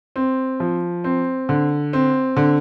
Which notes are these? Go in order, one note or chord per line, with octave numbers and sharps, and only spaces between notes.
C4
F3
C4
D3
C4
D3